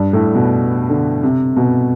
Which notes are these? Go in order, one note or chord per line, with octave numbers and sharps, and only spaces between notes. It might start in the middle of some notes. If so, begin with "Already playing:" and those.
Already playing: G2
A2
B2
D3
C3
B2